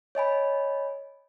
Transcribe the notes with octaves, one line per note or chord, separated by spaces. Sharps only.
C#5 D#5 G#5 B5